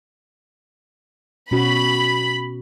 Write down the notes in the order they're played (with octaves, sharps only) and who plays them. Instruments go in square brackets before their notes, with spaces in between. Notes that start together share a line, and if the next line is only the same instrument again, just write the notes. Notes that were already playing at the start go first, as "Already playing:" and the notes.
[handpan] B2 C#4 F#4 [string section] B5